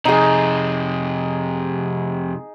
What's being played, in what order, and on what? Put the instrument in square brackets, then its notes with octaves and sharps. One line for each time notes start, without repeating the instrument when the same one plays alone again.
[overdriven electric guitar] F2 C3 [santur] D#4 G#4